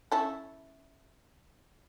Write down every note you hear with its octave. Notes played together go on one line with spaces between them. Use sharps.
C#4 E4 A4